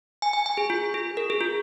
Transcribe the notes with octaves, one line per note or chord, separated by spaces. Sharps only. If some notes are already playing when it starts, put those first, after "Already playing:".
G#5
G#5
G#5
G#4
F4
G#4
A#4
G#4
F4